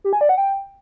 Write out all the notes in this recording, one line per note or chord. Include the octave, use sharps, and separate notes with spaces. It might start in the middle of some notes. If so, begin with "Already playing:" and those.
G4
G#5
D5
F#5
G5